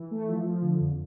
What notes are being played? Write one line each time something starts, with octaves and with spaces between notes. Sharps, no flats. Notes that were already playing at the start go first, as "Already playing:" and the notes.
Already playing: E3
A3
F3
F3
D3
F2